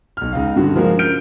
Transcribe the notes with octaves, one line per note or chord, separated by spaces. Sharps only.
B1 F6
C#2 D#4 F5
G2 D3 F#4
C#3 F3 G#3 A#3 F#4 A#4
F6 G6 D7